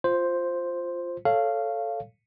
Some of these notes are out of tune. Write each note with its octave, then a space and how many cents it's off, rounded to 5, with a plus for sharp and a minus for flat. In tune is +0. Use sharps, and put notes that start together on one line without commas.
F4 +0 C5 +0
A4 +0 C#5 +0 F5 -10